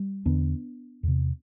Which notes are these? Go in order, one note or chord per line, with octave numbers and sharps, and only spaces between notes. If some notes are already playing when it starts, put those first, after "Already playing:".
Already playing: G3
E2 D3 B3 D4
E2 C3